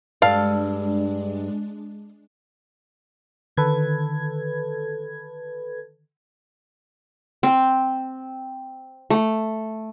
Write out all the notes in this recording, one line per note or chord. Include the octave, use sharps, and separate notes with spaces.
G2 G3 G#3 D4 A4 F5
D3 D#3 A4 B4 G#6
C4
A3